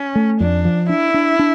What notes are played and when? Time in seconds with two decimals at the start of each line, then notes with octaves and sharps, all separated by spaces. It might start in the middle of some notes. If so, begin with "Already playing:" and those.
Already playing: C#4
0.15 A3
0.40 F2 D4
0.65 F3
0.89 D4 E4
1.14 D4
1.39 D4